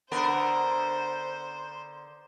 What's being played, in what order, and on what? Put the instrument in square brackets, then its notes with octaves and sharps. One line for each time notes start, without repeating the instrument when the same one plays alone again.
[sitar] D3 B3 A#4 [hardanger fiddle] C5